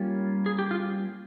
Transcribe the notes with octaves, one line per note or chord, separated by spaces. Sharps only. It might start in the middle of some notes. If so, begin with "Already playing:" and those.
Already playing: G3 A#3 C#4 F4
G#4
G4
F4